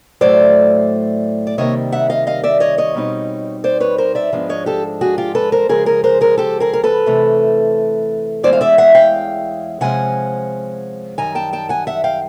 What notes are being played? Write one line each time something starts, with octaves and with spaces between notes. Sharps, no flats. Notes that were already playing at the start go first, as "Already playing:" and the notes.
A2 F#3 A3 C5 D5
D5
C3 D#3 G3 A#3 C#5 D#5
E5 F#5
D#5 F5
D#5 F5
D5 E5
C#5 D#5
C#5 D#5
B2 G3 C4 D#4
C5 D5
B4 C#5
A#4 C5
D5 E5
G#2 F3 G#3 B3 D4
C#5 D#5
G4 A4
F#4 G#4
F4 G4
A4 B4
A#4 C5
C#3 F3 G#3 G#4 A#4
G#4 A#4
A#4 C5
G#4 A#4
G4 A4
G#4 A#4
A#4
A4 B4
C3 E3 A3
E2 C#3 E3 G#3 C#4 C5 D5
F5
D5 E5
E5 F#5
F5 G5
C3 F3 G#3 C#4 F#5 G#5
F#2 D#3 G3 G#5 A#5
G5 A5
G5 A5
F#5 G#5
E5 F#5
F5 G5